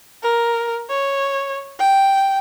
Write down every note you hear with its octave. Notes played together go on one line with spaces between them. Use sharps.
A#4
C#5
G5